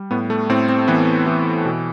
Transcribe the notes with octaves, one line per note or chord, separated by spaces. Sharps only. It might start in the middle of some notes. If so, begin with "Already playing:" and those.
Already playing: G3
A2 B3
A3
A2 C4
C4
E3 B3
E3
B2